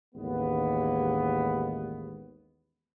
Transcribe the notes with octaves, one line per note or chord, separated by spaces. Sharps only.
A1 D#2 G#3 B3